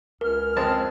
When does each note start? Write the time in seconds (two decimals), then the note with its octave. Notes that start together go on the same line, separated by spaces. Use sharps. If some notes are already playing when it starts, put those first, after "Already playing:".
0.21 C#2 C#4 A#4 F6
0.56 F2 G#3 C4 A5